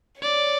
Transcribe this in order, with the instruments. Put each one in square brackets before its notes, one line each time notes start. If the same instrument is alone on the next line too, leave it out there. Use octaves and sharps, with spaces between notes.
[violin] C#5 [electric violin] D5